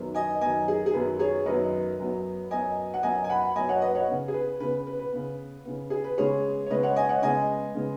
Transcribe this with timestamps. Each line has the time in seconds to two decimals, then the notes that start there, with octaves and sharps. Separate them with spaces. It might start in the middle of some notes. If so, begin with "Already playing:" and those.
Already playing: F#2 D#3 F#3 B3
0.15 D#5 G#5
0.41 F#2 D#3 F#3 B3 D#5 G#5
0.68 G#4
0.86 G#4
0.94 F#2 D#3 F#3 B3 B4
1.19 G#4 C#5
1.46 F#2 D#3 F#3 B3 B4 D#5
1.99 F#2 F#3 B3
2.51 F#2 F#3 B3 D#5 G#5
2.94 F#5
3.03 F#2 F#3 B3 D#5 G#5
3.24 G#5
3.29 F#5 B5
3.56 F#2 F#3 B3 D#5 G#5
3.69 C#5 F#5
3.82 B4 D#5
3.95 C#5 F#5
4.08 C#3 B3
4.28 G#4
4.34 B4
4.60 C#3 B3 B4
4.87 B4
4.99 B4
5.12 C#3 B3
5.65 C#3 B3
5.90 G#4
6.04 B4
6.18 C#3 G#3 B3 G#4 C#5
6.66 C#5
6.70 C#3 G#3 B3 B4 D#5
6.83 C#5 F#5
6.96 D#5 G#5
7.09 C#5 F#5
7.22 C#3 G#3 B3 D#5 G#5
7.75 C#3 G#3 B3